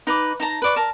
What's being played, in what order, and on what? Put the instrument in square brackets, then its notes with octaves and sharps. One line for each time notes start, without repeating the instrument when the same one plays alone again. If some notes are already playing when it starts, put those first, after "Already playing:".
[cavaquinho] D#4 B4 D6
D#4 A5 A#5
B4 D5 C#6
A#4 A5